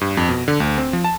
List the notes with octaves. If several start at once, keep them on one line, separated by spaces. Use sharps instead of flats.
G2
F2
B2
D3
D2
C4
F3
A5